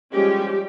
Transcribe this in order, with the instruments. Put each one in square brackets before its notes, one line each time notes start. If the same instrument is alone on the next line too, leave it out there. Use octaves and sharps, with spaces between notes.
[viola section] F3 G3 G#3 C#4 G4